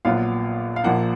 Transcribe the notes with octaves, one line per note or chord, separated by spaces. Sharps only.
A#1 A#2 F#3 B3 F4 F5
F5
A#1 A#2 F3 A#3 F#5